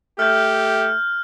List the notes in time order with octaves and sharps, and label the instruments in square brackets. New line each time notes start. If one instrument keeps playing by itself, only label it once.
[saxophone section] A3 E5 [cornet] G4 [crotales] F6 G6